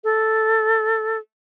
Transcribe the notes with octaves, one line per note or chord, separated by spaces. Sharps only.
A4